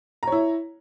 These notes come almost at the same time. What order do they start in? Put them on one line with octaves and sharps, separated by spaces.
A#5 C#5 E4